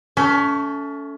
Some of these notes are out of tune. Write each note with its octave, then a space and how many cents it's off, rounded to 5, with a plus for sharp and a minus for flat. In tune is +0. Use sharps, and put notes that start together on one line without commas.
A3 +0 C#4 +30